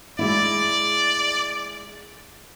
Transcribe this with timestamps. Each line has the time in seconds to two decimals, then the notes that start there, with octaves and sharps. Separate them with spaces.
0.19 G#3 A3 E4 D5